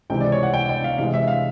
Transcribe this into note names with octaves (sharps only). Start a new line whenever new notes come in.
C#2 C3 E3 G#3 G5
D5
C#5
F#5
G5
G5
F5
C3 E3 G#3 F5
E5
F5